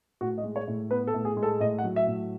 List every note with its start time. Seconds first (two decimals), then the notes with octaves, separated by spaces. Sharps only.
0.21 A2 F#4
0.38 D#5
0.43 G#3
0.56 C#5
0.68 A2
0.91 B3 B4
1.07 A4
1.14 A2
1.25 G#4
1.37 G#3
1.43 A4
1.60 A2 D#5
1.79 F#5
1.84 F#3
1.96 E5
2.07 A2